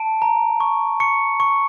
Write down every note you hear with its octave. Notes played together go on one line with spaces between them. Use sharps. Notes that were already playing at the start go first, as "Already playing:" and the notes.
Already playing: A5 D7
A#5
C#6
C#6 C#7
C#6